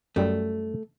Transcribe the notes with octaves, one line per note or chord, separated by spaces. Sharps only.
F#2 G3 A3